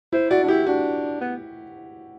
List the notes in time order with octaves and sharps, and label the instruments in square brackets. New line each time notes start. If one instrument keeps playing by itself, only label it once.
[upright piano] E4 [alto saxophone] C5
[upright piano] F#4 [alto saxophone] D5
[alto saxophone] D4
[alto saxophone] E4 [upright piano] G4
[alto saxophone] D4 [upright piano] F#4
[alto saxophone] B3